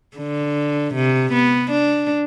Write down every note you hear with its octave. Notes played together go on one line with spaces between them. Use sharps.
D3
C3
B3
D4